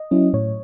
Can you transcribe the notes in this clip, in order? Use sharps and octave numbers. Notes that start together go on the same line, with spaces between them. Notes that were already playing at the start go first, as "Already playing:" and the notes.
Already playing: D#5
F#3 C#4 E4
A2 C#5